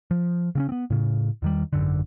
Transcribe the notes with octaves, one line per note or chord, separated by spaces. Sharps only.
F3
C#3 C4 C#4
B3 C4
A2 C#3
E2 D#3 G3
G#1 F#2 D3